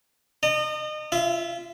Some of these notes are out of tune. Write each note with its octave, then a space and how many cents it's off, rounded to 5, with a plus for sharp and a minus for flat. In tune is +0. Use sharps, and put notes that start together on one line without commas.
D#5 -30 A#5 -40
F4 -30 E5 +0